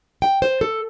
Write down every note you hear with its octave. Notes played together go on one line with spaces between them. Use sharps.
G5
C5
A4